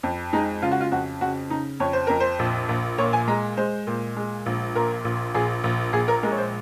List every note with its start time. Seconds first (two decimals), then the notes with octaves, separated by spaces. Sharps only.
0.03 F2
0.33 G#3 D#4
0.62 C#3 F4
0.71 F#4
0.81 F4
0.92 F2 F#4
1.21 C#3 F#4
1.50 C#3 D#4
1.80 F2 C#5
1.93 C5
2.07 F2 A#4
2.20 C5
2.39 A#1
2.69 A#1
2.98 A#2 C#5
3.13 G#5
3.28 G#3 A#5
3.57 G#3 C5
3.87 A#2
4.16 G#3
4.46 A#1
4.75 A#2 A#4
5.05 A#1
5.34 A#1 G#4
5.64 A#1
5.93 A#1 G#4
6.08 A#4
6.23 G#3 A#4
6.32 C#5
6.38 C5